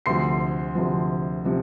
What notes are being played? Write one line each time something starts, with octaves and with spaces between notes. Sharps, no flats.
D2 C3 F3 C6 C7
D2 C3 F3
C3 F3